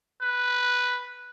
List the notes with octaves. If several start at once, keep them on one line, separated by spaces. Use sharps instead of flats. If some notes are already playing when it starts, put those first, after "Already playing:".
B4